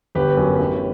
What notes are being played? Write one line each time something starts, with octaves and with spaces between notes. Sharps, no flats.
G1 G4 B4
F#2 F#3
A1